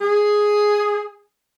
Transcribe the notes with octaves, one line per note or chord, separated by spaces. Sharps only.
G#4